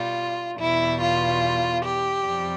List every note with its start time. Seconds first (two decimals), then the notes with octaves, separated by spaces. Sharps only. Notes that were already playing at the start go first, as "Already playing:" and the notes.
Already playing: B2 G3 F4
0.59 E2 B2 G3 E4
1.01 F4
1.85 G4
2.26 F2 C3 G3